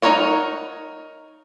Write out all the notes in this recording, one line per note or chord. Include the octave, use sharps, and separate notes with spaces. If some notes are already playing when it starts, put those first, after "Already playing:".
D#4 E4 A#4 C#5 F#5